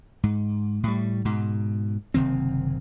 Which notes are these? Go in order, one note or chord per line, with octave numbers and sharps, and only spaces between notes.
G#2
A2 G3
G#2 B2
F#1 C3 D#3 C4